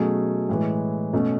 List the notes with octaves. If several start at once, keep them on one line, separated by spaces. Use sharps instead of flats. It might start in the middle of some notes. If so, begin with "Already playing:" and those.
Already playing: B2 F#3 A3 C#4 G#4
A2 E3 G#3
B2 A3 C#4